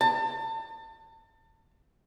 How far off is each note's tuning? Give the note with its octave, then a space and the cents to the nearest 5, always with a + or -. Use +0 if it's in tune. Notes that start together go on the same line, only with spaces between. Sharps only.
A5 +30